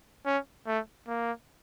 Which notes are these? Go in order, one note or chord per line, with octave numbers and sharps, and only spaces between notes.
C#4
A3
A#3